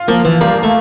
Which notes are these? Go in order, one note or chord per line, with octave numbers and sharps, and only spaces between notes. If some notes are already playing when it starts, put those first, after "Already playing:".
Already playing: F4
F3 A#3
E3
G3 A#3
A3